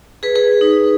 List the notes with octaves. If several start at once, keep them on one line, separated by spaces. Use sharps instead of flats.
G#4 B4
G#4 B4
D#4